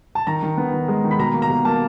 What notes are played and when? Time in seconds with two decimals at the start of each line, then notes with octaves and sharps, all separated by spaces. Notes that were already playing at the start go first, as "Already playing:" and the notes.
0.15 A5
0.27 D#3 A#5
0.43 D#3
0.57 B3
0.73 D#3
0.88 G#3
1.04 D#3
1.11 B5
1.19 B2 A#5
1.34 A#3
1.42 A#5
1.50 B2
1.65 A#3 A5